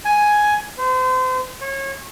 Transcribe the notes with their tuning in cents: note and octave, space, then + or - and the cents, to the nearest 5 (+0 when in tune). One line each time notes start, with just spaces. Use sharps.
G#5 +5
C5 -35
C#5 -30